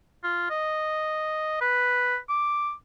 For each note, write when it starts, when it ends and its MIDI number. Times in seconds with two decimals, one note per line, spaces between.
0.24 0.47 65
0.50 1.57 75
1.61 2.18 71
2.29 2.73 86